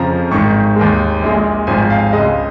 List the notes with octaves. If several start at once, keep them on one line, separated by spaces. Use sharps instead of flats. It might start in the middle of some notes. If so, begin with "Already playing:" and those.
Already playing: F2 C#3 F3 A#5
G#1 G#2 D#3 C#6
D#2 D#3 G#3
A#1 A#2 G#3
G#1 G#2 F3 G#5
F5
C#2 C#3 G#3 D#5